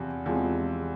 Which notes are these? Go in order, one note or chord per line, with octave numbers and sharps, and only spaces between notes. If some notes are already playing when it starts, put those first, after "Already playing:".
Already playing: E2 C3 F3
E2 C3 F3 G#3